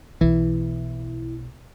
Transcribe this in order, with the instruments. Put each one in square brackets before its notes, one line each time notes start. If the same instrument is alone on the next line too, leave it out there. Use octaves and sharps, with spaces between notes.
[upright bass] B1 [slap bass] E3 [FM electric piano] E4